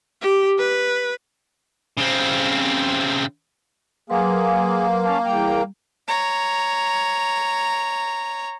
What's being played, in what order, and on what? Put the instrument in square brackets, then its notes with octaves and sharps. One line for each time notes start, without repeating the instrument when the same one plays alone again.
[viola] G4
B4
[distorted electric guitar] C#3 C4
[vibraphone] F#3 B4 C6 [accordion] A#3 [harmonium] G#4
[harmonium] C#4 F5 A5
[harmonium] E2 G5 A#5 [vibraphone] G3
[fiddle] C#5 A#5